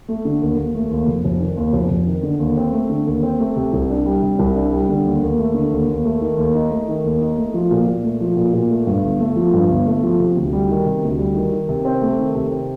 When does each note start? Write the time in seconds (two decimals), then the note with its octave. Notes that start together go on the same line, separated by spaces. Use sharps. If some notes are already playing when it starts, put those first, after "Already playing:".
0.08 A3
0.25 D3
0.41 D#2
0.57 D#2
0.75 A3
0.91 D#2
1.07 F1
1.24 F1
1.40 D#3
1.57 D#2
1.73 F1
1.90 F1
2.06 D#3
2.23 D3
2.39 D#2
2.57 C4
2.73 A3
2.90 D3
3.06 D#2
3.23 C4
3.39 A3
3.56 C3
3.73 C2
3.90 D4
4.06 G3
4.22 C3
4.39 C2
4.55 D4
4.72 G3
4.89 D3
5.06 D#2
5.22 D#2
5.38 A3
5.54 D3
5.71 D#2
5.89 D#2
6.05 A3
6.22 D#3
6.37 D#2
6.54 D#4
6.71 A3
6.88 D#3
7.05 D#2
7.20 D#4
7.38 A3
7.54 F3
7.71 A#2
7.87 A#2
8.04 A3
8.21 F3
8.36 A#2
8.53 A#2
8.70 A3
8.87 G2
9.04 G1
9.20 A3
9.36 F3
9.53 G2
9.69 G1
9.86 A3
10.03 F3
10.19 C3
10.36 D2
10.53 G3
10.69 D#3
10.86 C3
11.03 D2
11.19 G3
11.35 D#3
11.52 D#3
11.69 C3
11.85 C4
12.02 A3
12.19 D#3
12.35 C3
12.52 C4